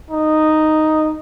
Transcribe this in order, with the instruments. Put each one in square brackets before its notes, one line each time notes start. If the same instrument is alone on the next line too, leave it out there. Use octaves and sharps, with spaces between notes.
[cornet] D#4